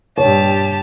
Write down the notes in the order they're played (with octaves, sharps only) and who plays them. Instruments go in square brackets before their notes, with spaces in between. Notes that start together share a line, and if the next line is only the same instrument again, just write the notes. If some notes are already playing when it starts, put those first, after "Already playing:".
[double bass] A#1 G2 [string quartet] G4 A5 [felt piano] C#5